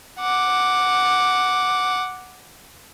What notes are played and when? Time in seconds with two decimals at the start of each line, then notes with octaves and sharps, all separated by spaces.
0.20 F#5 D6